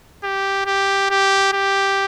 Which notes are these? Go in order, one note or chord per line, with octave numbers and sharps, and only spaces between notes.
G4
G4
G4
G4